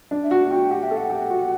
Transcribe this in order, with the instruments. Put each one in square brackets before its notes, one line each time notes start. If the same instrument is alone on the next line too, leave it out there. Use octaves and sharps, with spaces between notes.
[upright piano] D4
[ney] E5
[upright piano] F#4 [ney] F#5
[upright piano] F#4 [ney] G5
[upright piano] G4 [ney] F#5
[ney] E5
[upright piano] A4
[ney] F#5
[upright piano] G4
F#4